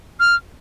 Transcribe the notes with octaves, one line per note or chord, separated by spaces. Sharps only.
F6